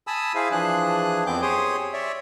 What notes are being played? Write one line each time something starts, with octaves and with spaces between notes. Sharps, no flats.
G#5 A5 B5 D#6 E6
E4 G#4 C5 E5 F5
E3 F3 D4 G#4 F#6
F2 B3 C4 D6 G6
G4 G#4 C5 C#5 C6 D#6
C#5 D5 E5